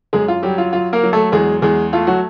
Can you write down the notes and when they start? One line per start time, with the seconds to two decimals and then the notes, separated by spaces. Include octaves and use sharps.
0.13 F#2 G#3 G#4
0.28 F4
0.42 F#3 G3 G4
0.58 F4
0.73 F#3 F4
0.93 A#3 A#4
1.03 F#3
1.13 A3 A4
1.32 E2 G#3 G#4
1.62 E2 G#3 G#4
1.93 A3 F4
2.07 F#3 F#4